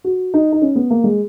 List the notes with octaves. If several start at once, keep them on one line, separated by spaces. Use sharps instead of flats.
F#4
D#4
D#4
C#4
B3
A#3
G#3